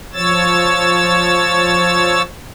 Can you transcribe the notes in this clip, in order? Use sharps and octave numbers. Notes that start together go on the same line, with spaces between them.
F3 C#5 E6 A6